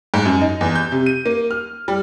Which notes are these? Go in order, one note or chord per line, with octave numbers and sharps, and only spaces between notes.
G#2
F#2
D#4
E2
G6
C3
D#7
A#3
F6
G3